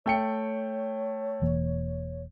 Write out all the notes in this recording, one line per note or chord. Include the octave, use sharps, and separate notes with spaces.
A3 C#5 G5 C#7
E1 E3 A#3